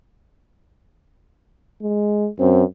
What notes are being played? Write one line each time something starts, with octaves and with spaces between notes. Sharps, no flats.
G#3
F#2 C4